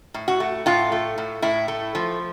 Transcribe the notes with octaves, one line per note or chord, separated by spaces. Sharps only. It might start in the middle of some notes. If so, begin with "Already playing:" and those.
A2
F#4
A3
A2 F4
A3
A2
A2 E4
A3
F3